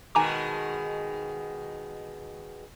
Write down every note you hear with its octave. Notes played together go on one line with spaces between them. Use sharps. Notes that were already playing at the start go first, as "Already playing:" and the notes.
B2 D#3 G#3 G#5 A#5 D6